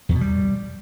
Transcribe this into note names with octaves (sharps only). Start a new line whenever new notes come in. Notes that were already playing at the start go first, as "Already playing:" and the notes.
E2
B2
G3